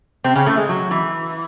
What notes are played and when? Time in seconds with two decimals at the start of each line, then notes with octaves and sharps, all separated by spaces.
0.24 C3 C4
0.36 C#3 C#4
0.46 A2 A3
0.57 G#3
0.69 F#3
0.91 E3